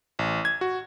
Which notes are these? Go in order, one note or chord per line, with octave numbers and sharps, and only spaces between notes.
A1
G#6
F#4